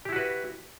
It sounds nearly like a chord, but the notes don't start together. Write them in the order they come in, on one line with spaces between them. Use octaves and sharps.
G4 E4 F#4 B4